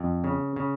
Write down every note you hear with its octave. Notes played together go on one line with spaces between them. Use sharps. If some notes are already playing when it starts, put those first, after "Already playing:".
Already playing: F2
C#3
C#3